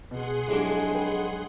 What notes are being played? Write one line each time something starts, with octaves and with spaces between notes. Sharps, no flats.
B2 G#4 F#5 C6
B1 F2 F#3 G#3 D4 E4 G4
B4 D#5 G5